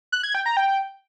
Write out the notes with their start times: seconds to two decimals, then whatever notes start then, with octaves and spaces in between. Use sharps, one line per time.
0.12 F#6
0.23 G#6
0.35 G5
0.46 A#5
0.57 G5